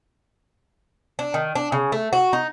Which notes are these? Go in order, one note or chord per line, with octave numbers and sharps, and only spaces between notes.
D4
D#3
D4
C#3
A3
F#4
D#4